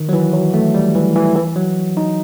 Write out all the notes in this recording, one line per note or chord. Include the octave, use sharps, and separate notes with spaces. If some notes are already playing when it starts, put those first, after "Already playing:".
Already playing: D#3
F#3
E3
F#3
A3
G3
E3
E3
E3
F#3
D#4